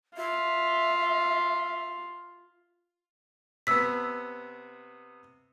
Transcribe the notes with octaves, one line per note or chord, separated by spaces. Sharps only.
F4 E5
C3 B3 E6 B6